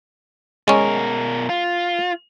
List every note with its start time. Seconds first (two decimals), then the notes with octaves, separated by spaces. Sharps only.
0.68 B2 G#3 C#4 A#4
1.49 F4